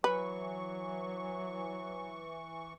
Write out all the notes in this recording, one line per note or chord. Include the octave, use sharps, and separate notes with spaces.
E3 F#3 B4 C#6